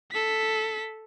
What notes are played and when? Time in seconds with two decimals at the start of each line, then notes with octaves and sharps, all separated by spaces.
0.11 A4 B6